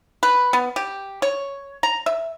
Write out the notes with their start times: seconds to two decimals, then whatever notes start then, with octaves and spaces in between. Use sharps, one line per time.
0.23 B4
0.53 B3
0.76 G4
1.22 C#5
1.83 A#5
2.06 E5